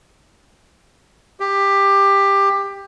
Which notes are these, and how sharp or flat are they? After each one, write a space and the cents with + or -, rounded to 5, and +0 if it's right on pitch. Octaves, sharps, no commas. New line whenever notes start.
G4 +15